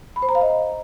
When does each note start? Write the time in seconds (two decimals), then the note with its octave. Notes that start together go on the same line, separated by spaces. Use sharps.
0.16 B5
0.22 C5
0.29 A#5
0.35 F5
0.41 D#5